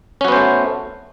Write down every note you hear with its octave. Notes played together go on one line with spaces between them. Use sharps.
A3 B3 C#4 F#4 C5